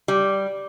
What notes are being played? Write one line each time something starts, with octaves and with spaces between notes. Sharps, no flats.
G3